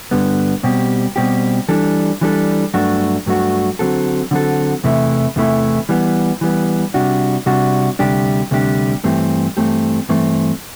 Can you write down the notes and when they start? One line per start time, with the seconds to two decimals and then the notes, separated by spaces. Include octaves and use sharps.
0.11 G2 D3 G3 B3
0.63 B2 G3 C4 G4
1.16 B2 G3 C4 G4
1.69 E3 G3 D4 A4
2.21 E3 G3 D4 A4
2.74 G2 F#3 A3 D4 F#4
3.26 G2 F#3 A3 D4 F#4
3.79 D3 F#3 C4 F#4 A4
4.31 D3 F#3 C4 F#4 A4
4.84 E2 C3 E3 A3 E4
5.36 E2 C3 E3 A3 E4
5.89 E3 G3 B3
6.41 E3 G3 B3
6.94 C3 G3 D4 F#4
7.46 C3 G3 D4 F#4
7.99 D2 C3 G3 D4 G4
8.51 D2 C3 G3 D4 G4
9.04 G2 E3 A3 C4 G4
9.57 G2 E3 A3 C4 G4
10.09 G2 E3 A3 C4